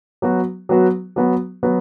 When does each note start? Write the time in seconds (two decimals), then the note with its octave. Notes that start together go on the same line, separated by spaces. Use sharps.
0.22 F#3 B3 F#4
0.69 F#3 B3 F#4
1.16 F#3 B3 F#4
1.63 F#3 B3 F#4